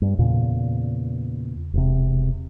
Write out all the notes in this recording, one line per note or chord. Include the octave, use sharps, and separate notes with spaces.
G2
E2 A#2 C#3
E1 C3